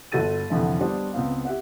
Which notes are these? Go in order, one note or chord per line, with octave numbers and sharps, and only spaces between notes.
G1 F#4 A4 A6 D#7
C2 F2 D3 E3 F3 E5
G3 B3 D4 C5 D#5
C#2 B3 C4 F5
G4 E5 F#5